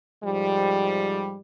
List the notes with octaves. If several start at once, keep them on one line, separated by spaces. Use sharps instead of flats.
G#2 F3 G3